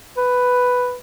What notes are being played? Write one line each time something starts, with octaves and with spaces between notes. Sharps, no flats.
B4